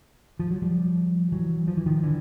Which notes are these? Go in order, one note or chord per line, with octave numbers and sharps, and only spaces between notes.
F3
F#3
F3 G3
E3 F#3
F3
E3
D#3 F3
D3 E3